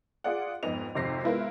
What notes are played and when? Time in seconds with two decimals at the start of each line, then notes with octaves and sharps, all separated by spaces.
0.24 F4 G#4 D5 F#5
0.63 F2 G#2 B3 D#5 F7
0.95 G#1 F2 C3 A#6 C7
1.24 G#3 B3 E4 F4 A#4 B4